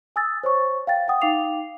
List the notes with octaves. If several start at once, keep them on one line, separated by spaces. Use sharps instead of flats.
G#5 D#6 E6 A6
C5 C#5 C#6
F5 G5 A6
F#5 G5 D#6
D#4 F5 G5 D6 C7 F7